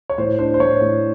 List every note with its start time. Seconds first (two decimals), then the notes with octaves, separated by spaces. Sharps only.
0.10 C#5
0.18 A2 C5
0.39 D4 C5
0.54 C5
0.60 A2 C#5
0.81 A2